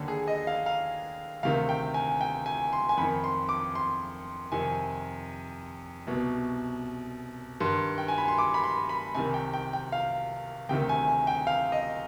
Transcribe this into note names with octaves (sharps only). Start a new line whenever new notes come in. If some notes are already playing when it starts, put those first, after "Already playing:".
Already playing: D#2 D3
G#4
D#5
F5
F5
D2 C3 D#3 F5
G5
G#5
G5
G#5
C6
G#5
F2 D#3 B5
C6
D6
C6
F2 C3 D#3 G#5
C2 B2
G2 D#3 C6
G5
G#5
B5
C6
D6
B5
C6
B5
C2 C3 D#3 G#5
G5
G5
G5
F5
D2 C3 D#3 G5
G#5
G#5
G5
F5
D#5